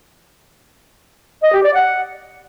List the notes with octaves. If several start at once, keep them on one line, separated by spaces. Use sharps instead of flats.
D#5
G4
D5
F#5